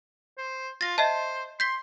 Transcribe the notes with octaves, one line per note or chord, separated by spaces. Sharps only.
C5
F4 A6 A#6
C5 D#5 E5 A5
C6 G6 B6 G7